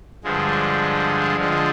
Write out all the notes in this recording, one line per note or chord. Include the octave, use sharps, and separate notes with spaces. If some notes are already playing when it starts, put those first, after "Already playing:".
G2 D3 F3 G#3
D3 F3 G#3